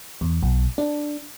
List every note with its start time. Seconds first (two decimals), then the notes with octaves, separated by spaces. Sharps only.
0.21 E2
0.43 B1
0.78 D4